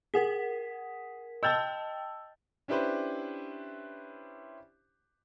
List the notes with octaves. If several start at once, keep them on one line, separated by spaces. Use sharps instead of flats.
G#4 A#4 F#5 B6
D#5 G5 A5 E6 G6 A6
C#4 D4 E4 G4 B4 C5